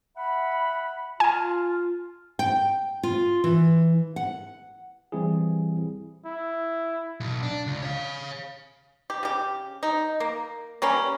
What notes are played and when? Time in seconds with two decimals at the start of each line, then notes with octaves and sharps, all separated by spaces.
0.16 E5 F#5 B5
1.20 F4 G#5
2.39 G5
3.03 F4
3.44 E3
4.16 F#5
5.12 E3 G3 C4 E4 G#4
6.26 E4
7.20 B1
7.43 D4
7.67 C#2
7.82 C#5 F5
9.10 G4
9.23 C#3 G4
9.83 D#4
10.20 A#3
10.82 G3 A#3 C#4